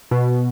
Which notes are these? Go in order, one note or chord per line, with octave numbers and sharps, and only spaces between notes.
B2